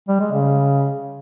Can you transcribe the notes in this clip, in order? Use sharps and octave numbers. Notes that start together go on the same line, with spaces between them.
G3
G#3
C#3